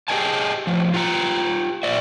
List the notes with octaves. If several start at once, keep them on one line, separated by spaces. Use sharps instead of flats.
G4 G#4 B4 D#5 G#5 A5
A2 F3
F4 G4 A#5
A#2 D5 E5